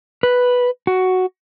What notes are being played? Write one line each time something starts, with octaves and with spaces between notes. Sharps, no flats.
B4
F#4